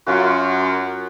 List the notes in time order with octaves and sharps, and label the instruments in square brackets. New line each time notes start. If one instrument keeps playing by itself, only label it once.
[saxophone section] F#2 [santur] F4 F#4